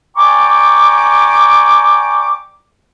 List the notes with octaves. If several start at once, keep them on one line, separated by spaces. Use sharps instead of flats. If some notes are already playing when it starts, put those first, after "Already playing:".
D5 G5 G#5 A#5 C#6 D6